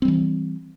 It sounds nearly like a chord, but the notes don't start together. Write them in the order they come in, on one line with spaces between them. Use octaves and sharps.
C4 G3 E3